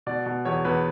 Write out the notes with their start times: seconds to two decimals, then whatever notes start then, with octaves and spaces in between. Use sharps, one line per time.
0.06 B2 D5
0.26 B2
0.45 E2 C#5
0.65 E2 B4